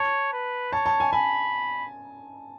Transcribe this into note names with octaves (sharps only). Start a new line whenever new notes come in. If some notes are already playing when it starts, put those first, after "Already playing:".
Already playing: C#5 A5
B4
C#5 A5
A5
G#5
G#5 B5